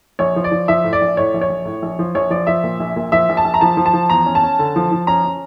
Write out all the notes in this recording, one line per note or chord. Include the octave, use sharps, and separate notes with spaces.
A#1 C#5
F3
D5
F3
F3 E5
A2
D5
A#1
A2 C#5
A#1
C#5
A#1
A2
A#1
F3
A#1 C#5
F3 D5
F3 E5
A#2
A#1
A#2
F3 E5
A#1
A5
A#1
A#5
F3 A5
F3
A5
F3
E2 A#5
C#4
A5
C#4
D3
F3
F3
C#4 A#5
C#4